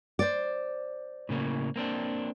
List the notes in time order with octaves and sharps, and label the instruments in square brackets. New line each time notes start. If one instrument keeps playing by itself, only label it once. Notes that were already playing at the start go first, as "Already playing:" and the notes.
[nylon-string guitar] C5 D5
[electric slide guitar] A2 C#3 A#3
A#3 C4 D4